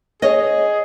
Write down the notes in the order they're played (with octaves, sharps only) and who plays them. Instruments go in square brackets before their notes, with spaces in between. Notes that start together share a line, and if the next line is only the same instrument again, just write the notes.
[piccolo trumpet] G#4 [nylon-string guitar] C#5 D#5